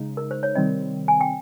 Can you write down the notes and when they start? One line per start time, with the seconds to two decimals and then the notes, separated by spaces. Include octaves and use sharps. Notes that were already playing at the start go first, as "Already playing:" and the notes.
Already playing: C#3 G#3 D#4
0.17 A#4
0.31 C5
0.43 C#5
0.55 C3 D#3 G3 C4 D#5
1.08 G#5
1.21 G5